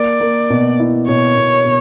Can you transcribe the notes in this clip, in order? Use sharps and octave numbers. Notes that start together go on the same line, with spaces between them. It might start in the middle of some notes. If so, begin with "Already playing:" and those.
Already playing: A#3 D5
A#3
B2
E4
B2 C#5
B2
B2